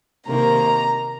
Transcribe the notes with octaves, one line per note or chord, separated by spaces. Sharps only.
C3 D#3 A#3 A#5